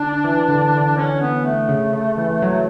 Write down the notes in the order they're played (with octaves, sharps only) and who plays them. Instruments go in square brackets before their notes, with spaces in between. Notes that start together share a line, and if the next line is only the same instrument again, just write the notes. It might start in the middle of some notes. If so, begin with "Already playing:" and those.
Already playing: [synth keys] D3 [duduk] D4
[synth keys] E3
D3
D3
[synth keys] D3 [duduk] C#4
[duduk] B3
A3
[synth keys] C#3
C#3
E3
F#3